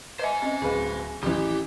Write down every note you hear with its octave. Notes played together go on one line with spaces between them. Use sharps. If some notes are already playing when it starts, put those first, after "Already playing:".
B4 C5 D#5 E5 G#5
C4 C#4 D#5
D1 G#4 B4 F5
A1 E3 G4